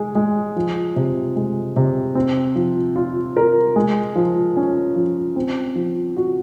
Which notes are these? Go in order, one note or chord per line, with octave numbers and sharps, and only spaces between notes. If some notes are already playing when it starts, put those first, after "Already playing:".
Already playing: G#3 G#4
G#3
F3
C3
G#3
C3
C4
F3
F4
A#4
G#3
F3
C#4
F3
C4
F3
F#4